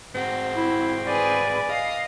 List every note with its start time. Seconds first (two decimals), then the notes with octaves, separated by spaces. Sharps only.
0.15 G#2 C4 F#4
0.56 E4
1.06 G#4 B4 D5
1.70 D#5 F5 C7